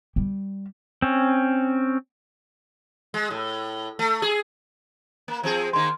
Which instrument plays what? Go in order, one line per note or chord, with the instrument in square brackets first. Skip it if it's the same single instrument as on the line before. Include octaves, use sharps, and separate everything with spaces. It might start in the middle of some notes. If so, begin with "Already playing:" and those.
[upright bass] G3
[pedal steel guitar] C4 C#4
[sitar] G#3
A2
A3
G#4
A#3
F3 C4 G#4
[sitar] D#3 A#3 [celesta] C6